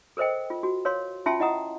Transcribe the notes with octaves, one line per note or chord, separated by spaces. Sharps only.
A4 A#4 C5 D#5 G5
F4
F#4
A#4 C#5 F5 C6
C#4 F4 E5 G5 A5 C6
E4 D#5 F#5 A#5 D#6